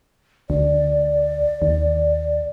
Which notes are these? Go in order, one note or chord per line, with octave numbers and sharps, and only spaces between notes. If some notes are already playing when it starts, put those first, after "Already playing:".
D2 D5
D#2